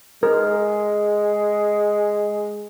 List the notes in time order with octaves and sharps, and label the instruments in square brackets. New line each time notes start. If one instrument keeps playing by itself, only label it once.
[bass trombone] G#3 [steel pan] A#4